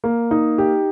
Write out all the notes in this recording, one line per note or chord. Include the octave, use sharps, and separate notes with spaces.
A#3
D#4
G4